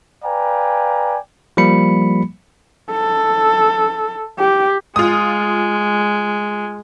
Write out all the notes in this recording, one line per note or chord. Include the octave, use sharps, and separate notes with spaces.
B4 D5 F5 G5 G#5 A#5
F3 G3 A#3 B5 C#7
A4
G4
G#3 F4 D#6